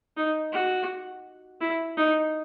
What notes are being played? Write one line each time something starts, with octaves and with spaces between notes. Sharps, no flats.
D#4
F#4
E4
D#4